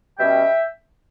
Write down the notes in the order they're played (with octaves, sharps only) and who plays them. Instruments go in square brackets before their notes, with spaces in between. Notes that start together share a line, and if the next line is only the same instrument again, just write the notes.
[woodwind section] B2 G3 C#4 E5 G5